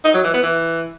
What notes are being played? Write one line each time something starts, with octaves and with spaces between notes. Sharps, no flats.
D#4
F#3
E3
B3
E3